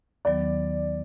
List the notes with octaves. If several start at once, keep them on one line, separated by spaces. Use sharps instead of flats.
D#2 D#3 F#3 B3 D5